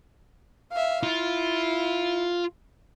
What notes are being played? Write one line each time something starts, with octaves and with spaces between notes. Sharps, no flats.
E5 F5
E4 F4